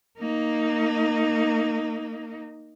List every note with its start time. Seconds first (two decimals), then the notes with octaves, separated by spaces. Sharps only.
0.18 A#3 D#4